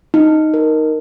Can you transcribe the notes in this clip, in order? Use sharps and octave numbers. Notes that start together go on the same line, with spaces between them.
D#4
A#4